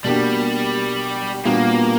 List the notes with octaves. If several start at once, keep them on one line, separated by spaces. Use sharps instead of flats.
B2 G3 A#3 D4 G4
A#2 G3 A#3 B3 D4 F#4